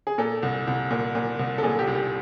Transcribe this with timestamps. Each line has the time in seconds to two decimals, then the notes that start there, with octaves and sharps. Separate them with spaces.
0.07 G#4
0.18 A#2 A4
0.43 C2
0.67 C2
0.90 A#2
1.15 A#2
1.39 C2
1.58 A4
1.63 A#2 G#4
1.79 G4
1.87 C2
1.95 G4